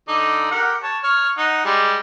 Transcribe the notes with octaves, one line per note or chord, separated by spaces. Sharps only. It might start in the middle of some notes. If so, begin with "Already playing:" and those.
D3 D#4 D5
G4 A#4 F#5
C#5 A5
C#5 F6
D#4 F#5
G3 G#3